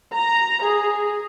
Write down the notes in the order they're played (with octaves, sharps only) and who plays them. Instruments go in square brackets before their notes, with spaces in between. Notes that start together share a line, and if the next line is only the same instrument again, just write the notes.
[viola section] A#5
G#4